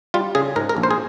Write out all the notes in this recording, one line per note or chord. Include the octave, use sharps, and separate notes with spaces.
G3 F4
C#3 G#4
G#2 A#4
A#4
A#1
C5
G#4